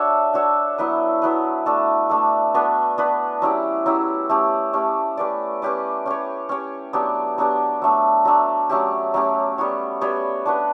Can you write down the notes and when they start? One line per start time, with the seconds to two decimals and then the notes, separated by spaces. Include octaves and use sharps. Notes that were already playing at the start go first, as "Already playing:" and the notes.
Already playing: D4 F#4 C#5 E5
0.34 D4 F#4 C#5 E5
0.78 F#3 B3 E4 B4
1.22 F#3 B3 E4 B4
1.66 A3 D4 A4
2.10 A3 D4 A4
2.54 B3 D4 F#4 B4
2.98 B3 D4 F#4 B4
3.42 F#3 C#4 E4 G4
3.86 F#3 C#4 E4 G4
4.29 A3 C#4 G4
4.73 A3 C#4 G4
5.17 C#4 G4 B4 D5
5.62 C#4 G4 B4 D5
6.06 C#4 G4 C#5
6.49 C#4 G4 C#5
6.93 F#3 B3 D4 G4
7.38 F#3 B3 D4 G4
7.82 F#3 A3 D4
8.25 F#3 A3 D4
8.69 F#3 A3 C#4 G4
9.14 F#3 A3 C#4 G4
9.58 G3 B3 F#4 C#5
10.01 G3 B3 F#4 C#5
10.46 D4 F#4 B4